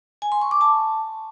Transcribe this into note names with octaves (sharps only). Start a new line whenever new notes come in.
G#5
C6
C#6
D6
A5